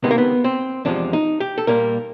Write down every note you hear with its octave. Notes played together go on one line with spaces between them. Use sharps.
C#2 C3 D#3 G#3 B3
A#3
B3
C4
E2 C3 F3 G#3 D4
D#4
G4
A4
A#2 G3 A#3 A#4